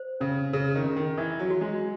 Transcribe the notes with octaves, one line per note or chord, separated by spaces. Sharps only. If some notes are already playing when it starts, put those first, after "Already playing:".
Already playing: C5
C#3 C#4
C#3 G#4
D#3
C#4
D#3
E3 E5
F#3
F#4
G#3